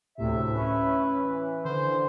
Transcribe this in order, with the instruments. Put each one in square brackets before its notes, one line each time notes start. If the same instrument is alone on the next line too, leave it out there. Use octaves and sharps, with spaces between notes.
[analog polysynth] D2 A2 C3 [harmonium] E5
[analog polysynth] C#4 [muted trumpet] B4
[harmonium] E3
[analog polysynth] D3 [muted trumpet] C5